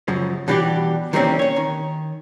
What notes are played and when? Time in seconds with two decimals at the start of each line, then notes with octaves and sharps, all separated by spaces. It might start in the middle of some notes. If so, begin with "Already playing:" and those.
0.08 F#2 C#3 F3
0.48 B2 E3 G3 D4 F#4 G4
1.13 D#3 E3 G3 A#3 C4 C#4
1.39 C#4 C#5
1.56 D#3